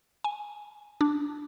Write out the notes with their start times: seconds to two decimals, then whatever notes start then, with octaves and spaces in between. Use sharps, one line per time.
0.24 G#5
1.01 D4